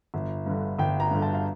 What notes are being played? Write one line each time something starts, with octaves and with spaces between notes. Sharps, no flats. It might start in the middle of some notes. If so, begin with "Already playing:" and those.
G1
G2 D3
G1 G5
A#5
G2 D3
A5
F5